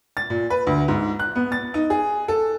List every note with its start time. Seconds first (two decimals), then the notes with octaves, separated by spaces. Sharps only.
0.17 A6
0.30 A#2
0.50 B4
0.67 D2
0.88 G#2
1.20 F#6
1.36 B3
1.52 A6
1.74 D#4
1.90 G#4
2.28 A4